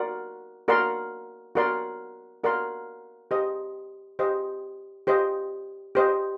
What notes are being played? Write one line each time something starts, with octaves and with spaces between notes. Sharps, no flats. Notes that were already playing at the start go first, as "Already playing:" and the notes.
Already playing: F#4 A#4 D5 F#5 C6
F#4 A#4 D5 F#5 C6
F#4 A#4 D5 F#5 C6
F#4 A#4 D5 F#5 C6
G4 C5 D#5
G4 C5 D#5
G4 C5 D#5
G4 C5 D#5